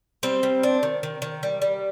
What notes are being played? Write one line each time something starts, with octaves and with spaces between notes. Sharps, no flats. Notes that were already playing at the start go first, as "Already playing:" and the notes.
G3 C4 C5
G3
D4
D#3
D#3
D#3
G3
G3